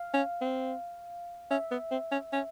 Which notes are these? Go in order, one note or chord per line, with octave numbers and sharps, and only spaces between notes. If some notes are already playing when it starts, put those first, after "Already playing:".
Already playing: F5
C#4
C4
C#4 E5
B3
C4
C#4
C#4